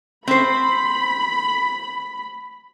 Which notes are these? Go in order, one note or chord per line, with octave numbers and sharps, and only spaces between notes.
C4 C5 B5